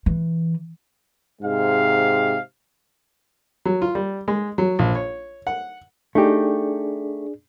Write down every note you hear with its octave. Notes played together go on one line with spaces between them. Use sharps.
E3
G#2 C3 G#3 F5
F#3
F4
G3
G#3
F#3
A#1
C#5
F#5
A3 D4 D#4 G4 G#4 D5